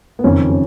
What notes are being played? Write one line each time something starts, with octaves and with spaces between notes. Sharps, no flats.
B3
F#1 F2 D#3 C#4
C#4